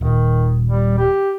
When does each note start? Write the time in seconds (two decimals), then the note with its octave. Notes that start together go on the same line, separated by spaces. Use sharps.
0.01 D#1 D#3
0.69 G3
0.98 G4